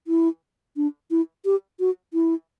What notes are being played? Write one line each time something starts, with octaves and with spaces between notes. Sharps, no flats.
E4
D4
E4
G4
F#4
E4